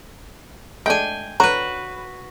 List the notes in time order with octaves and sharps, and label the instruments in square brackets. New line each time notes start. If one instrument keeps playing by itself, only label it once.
[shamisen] G#3 A3 D4 [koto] G5 G#5
[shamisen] D3 C#5 A#5 [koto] F#4 B4